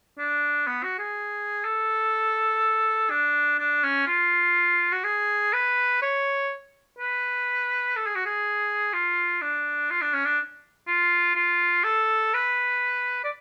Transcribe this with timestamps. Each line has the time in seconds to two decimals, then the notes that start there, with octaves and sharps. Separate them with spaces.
0.18 D4
0.67 B3
0.83 F#4
0.99 G#4
1.64 A4
3.10 D4
3.58 D4
3.83 C#4
4.07 F4
4.92 F#4
5.04 G#4
5.53 B4
6.02 C#5
6.99 B4
7.96 A4
8.06 G#4
8.15 F#4
8.26 G#4
8.93 F4
9.42 D4
9.91 F4
10.01 D4
10.13 C#4
10.25 D4
10.87 F4
11.35 F4
11.84 A4
12.34 B4
13.24 D5